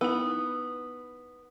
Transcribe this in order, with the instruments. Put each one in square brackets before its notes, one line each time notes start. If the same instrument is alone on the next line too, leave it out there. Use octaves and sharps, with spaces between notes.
[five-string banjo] B3 [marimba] D#4 E4